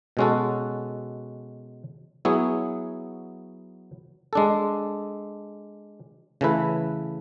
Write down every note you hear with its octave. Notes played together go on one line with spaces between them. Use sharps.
B2 G#3 C#4 F#4 A4
F#3 B3 E4 G#4 C#5
G#3 D4 A4
C#3 E3 A3 E4 B4